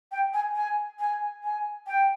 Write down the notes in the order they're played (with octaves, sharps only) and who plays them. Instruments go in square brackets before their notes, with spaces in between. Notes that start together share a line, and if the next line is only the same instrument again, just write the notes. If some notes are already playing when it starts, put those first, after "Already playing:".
[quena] G5
G#5
G#5
G#5
G#5
G5